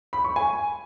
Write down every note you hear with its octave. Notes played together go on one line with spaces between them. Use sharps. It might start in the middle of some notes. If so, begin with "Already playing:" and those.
B5
C#6
G#5